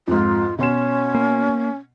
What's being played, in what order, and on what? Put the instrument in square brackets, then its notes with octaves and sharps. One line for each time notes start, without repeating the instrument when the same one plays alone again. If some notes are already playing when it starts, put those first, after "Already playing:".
[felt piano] F2 G#2 [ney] F4
[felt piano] B2 C6 E7 [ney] C#4
[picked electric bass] A#3